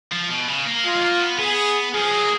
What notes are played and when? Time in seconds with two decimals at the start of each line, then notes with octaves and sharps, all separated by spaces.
0.12 F3
0.29 B2
0.48 C#3
0.66 A#3
0.84 G#3 F4
0.96 G#3
1.02 A#3
1.20 B3
1.39 B3 G#4
1.94 F3 G#4
2.12 F#3
2.22 A#3